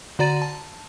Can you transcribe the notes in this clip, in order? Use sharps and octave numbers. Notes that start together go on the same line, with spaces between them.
D3 F#4 D5 A#5 A6 D#7
A5